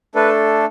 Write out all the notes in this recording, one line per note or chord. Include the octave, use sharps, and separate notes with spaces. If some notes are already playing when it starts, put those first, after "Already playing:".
A3 D4 A4 B4